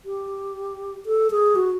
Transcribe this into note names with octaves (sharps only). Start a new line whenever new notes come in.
G4
A4
G#4
F#4